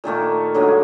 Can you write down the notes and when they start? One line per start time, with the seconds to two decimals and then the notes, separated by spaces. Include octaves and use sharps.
0.04 A#2 D#3 A3 A#3
0.54 D3 F#3 G#3 A#3